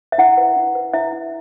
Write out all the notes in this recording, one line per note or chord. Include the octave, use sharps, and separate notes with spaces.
E5
E4 F#5
B4
E4
B4
E4 E5
E4